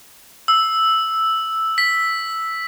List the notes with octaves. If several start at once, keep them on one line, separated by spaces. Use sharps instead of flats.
E6
B6